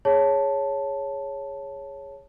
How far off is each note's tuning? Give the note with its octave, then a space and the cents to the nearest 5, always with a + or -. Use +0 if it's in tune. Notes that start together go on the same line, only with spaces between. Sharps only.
G#4 -10 C#5 +0 A5 +0